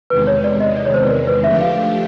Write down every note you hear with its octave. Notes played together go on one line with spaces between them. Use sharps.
E2 C3 D#3 G#3 B4
C#5
D5
D#5
D5
C#5
C5
B4
A#4
B4
D3 F3 A3 D4 G4 E5
F5